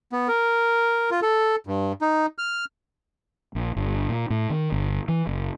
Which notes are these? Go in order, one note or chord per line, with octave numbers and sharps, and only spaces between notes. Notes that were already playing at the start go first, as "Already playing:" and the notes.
B3
A#4
F4
A4
G2
D#4
F6
A#1
G1
A#2
A2
D#3
G1
E3
F#1